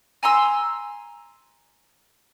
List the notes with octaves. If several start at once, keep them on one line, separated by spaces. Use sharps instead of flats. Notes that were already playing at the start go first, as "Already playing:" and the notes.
G#5 A#5 C6 E6